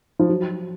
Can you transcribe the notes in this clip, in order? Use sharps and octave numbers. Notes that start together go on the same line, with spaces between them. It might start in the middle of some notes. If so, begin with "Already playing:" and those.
F3
F#3